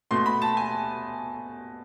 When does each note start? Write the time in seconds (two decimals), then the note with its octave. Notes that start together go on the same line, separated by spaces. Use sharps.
0.11 B2 A3 C6
0.26 B5
0.42 A5
0.57 G#5